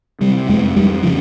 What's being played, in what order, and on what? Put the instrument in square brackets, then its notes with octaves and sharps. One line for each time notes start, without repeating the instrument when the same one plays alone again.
[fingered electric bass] C3 G3
F2 G#3
F2 G3
C#3 F3